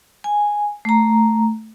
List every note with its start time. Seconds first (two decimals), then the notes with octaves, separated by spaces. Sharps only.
0.24 G#5
0.85 A3 A#5